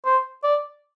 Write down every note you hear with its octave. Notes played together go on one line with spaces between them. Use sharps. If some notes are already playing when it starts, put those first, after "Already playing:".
C5
D5